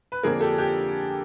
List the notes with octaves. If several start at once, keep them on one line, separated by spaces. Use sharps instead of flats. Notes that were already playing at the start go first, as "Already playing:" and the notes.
B4
F2 D3 F3 A#3 D4 G#4 A#4
G4 A4
G4